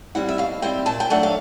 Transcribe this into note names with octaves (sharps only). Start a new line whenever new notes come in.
G3 C4 E4 F#5
E5
B2 F5
G3 C4 E4 G5
A#2 A5
G5
F#3 A3 D4 F#5
F5